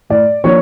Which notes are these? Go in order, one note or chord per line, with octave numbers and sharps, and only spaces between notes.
A2 D5
F3 A#3 D4 C#5